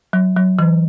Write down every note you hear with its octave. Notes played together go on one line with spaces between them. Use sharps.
F#3
F#3
E3